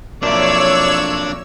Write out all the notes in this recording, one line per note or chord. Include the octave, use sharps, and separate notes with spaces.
B1 F2 A#3 D4 C#5 D5 E5 E6